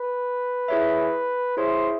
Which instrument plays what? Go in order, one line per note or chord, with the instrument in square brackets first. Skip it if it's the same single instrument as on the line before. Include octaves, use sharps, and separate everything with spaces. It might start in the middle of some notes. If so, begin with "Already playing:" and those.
Already playing: [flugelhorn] B4
[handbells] E4 G#4 C#5 E5
[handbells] E4 G#4 C#5 E5 [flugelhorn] C5